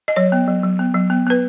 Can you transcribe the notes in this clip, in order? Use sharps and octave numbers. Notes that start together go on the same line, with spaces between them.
D#5
F#3 C#5
B3
F#3
F#3
B3
F#3
B3
B3 B4